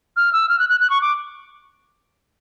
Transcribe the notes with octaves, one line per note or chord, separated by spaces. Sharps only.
F6
E6
F6
F#6
F#6
F#6
C#6
D6